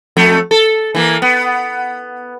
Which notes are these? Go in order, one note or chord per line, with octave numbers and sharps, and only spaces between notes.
F2 A3
A4
E3 A#3
B3